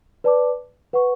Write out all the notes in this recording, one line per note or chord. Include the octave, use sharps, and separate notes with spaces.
B4 D5 A5 D6
B4 F#5 C#6